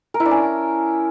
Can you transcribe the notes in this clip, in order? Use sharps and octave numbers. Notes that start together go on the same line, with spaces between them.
A#4
E4
D4
C#4